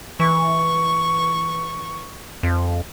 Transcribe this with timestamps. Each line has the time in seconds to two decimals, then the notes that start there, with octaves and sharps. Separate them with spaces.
0.20 E3 C#6
2.43 F2